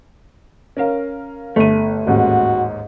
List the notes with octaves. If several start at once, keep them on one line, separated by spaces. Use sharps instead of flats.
C#4 A#4 F5
G1 A3 D#7
A1 D#2 G#2 F#4